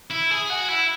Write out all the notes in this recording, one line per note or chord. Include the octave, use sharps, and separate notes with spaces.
E4
G#4
F#4
E4